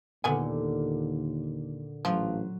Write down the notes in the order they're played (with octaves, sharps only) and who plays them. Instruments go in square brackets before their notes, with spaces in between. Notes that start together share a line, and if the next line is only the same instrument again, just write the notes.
[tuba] D#2 [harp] A#2 D3 [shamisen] B3 F#4 G#5
[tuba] A1 [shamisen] F3 [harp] F#3